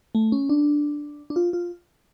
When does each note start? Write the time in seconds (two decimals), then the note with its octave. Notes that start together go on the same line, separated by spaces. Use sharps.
0.15 A3
0.32 C#4
0.49 D4
1.30 D4
1.36 F4
1.53 F4